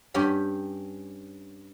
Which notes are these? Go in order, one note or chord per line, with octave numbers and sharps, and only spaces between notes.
G2 C#4 G4 B5